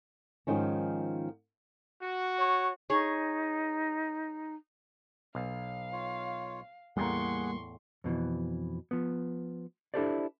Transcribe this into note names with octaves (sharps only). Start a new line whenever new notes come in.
G#2 D#3 F3 C#4
F#4
C#5
D#4 G#4 C#5
B1 F5
F4 C#5
E2 A2 G3 A#3 G#4 F#5 C6 C#6
F2 B2 D3 E3
F3 B3
D4 E4 G4 A4 C5 D5